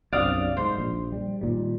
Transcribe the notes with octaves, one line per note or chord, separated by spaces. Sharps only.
B1 F#2 C3 D5 F5 D#6
G#2 C5
A#1
G3
A#2 D#3 G3